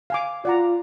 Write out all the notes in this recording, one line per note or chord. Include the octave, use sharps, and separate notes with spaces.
F5 G#5 D6
F4 D5 F#5 A#5